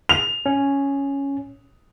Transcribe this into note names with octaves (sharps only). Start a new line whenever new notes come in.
F7
C#4